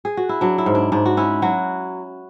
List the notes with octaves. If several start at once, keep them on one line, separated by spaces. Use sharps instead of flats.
G#4
F#4
E4
F#3 D4
E4
G#2
D4
G#2 D4
F#4
C#4 E4
F#3 F#4